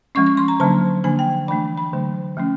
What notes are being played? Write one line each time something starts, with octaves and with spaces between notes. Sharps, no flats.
F3 G#3 C#4 C#6
C#6
C6
A#5
D3 F#3 A#3 D4 A5
D3 F3 A#3 D4 G#5
G5
E3 A3 D4 B5
B5
D3 F#3 A3
F3 A3 C#4